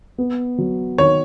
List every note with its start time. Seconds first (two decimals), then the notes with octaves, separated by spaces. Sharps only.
0.18 B3
0.58 F#3
0.98 D#3 C#5